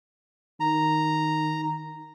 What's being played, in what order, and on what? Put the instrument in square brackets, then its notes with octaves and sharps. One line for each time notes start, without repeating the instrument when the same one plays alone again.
[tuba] D#3 [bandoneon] A#5